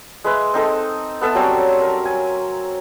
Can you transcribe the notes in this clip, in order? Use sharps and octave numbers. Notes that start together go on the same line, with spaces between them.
G#3 B4 E5
C4 D#4 A4
B3 A4 E5 A5
F#3 G3 C4 C#4
A#4
G#5